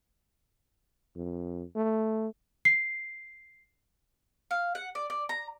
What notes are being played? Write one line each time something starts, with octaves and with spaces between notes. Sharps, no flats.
F2
A3
C7
F5
F#5
D5
D5
A#5